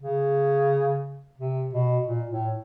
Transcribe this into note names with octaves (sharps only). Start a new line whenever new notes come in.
C#3
C3
B2
A#2
A2